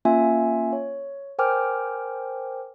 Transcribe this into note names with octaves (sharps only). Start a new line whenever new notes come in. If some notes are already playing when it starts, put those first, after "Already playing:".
A#3 C#4 F4 E5 G#5
C#5
A#4 C5 G5 G#5 D6 F6